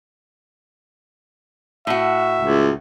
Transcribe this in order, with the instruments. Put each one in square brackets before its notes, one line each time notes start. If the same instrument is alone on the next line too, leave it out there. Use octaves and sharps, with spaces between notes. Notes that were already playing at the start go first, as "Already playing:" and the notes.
[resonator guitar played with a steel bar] A2 F#4 [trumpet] E5
[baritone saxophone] C#2